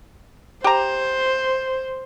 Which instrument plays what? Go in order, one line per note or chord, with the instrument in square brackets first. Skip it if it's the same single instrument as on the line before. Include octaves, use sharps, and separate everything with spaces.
[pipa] G4 A#5 [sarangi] C5